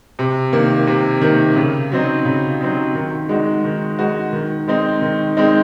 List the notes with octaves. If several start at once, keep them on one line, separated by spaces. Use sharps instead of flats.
C3
D#3 A#3
C3
D#3 A#3
C#3
F#3 C4 D#4
C#3
F#3 C4 D#4
D#3
G#3 D#4 F#4
D#3
G#3 D#4 F#4
D#3
G#3 C4 D#4
D#3
G#3 C4 D#4